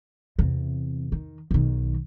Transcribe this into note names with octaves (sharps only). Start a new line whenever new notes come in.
E2 C3
D#3
B1 D#3